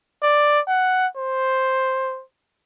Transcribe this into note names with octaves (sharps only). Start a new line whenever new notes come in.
D5
F#5
C5